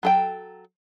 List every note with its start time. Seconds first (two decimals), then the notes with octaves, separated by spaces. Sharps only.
0.03 F#3 A4 G5